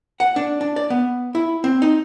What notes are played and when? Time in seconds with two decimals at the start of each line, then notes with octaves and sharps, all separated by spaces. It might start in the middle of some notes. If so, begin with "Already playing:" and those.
0.20 F#5
0.36 D4
0.61 D4
0.76 D5
0.90 B3
1.35 E4
1.64 C4
1.82 D#4